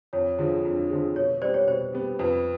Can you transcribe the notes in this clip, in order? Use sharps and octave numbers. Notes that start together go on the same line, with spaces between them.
F2 C#5
D3 F3 G#3
F2
D3 F3 G#3
B2 C#5
G3 B3 C5 D5
C#5
B2 C5
G3 B3
F2 B4